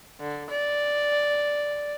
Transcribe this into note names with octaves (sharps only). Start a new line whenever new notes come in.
D3
D5